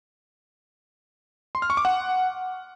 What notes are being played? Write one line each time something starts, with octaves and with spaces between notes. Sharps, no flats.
C6
F6
C#6
D6
F#5